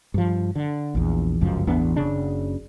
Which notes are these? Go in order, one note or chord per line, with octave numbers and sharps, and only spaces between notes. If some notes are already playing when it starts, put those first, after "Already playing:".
G2 F3
D3
A#1 E2
G1 C#2 F#2 F3
A1 E2 B3 D4
F#1 C#3 D4